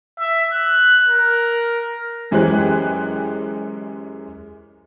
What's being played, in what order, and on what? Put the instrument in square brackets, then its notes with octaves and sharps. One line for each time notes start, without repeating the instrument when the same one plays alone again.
[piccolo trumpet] E5
F#6
A#4
[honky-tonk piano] F#2 E3 G#3 G4 C5 F#6